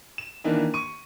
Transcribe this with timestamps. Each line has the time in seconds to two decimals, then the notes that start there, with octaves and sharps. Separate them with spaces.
0.18 E7
0.44 D#3 E3 A#3 D4 E4
0.74 C#6 D#7